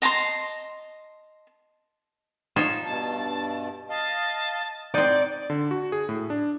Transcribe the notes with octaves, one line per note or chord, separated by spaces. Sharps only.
D#5 A5 A#5 C6
D#4 F4 C#5 E7
G2 B2 A5
D#5 F5 A5
A2 C4 D#4 D5 F#6 G6
D3
F#4
G#4
A2
D4